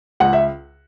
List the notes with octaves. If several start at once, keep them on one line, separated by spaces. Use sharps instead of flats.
C#2 F#5
E5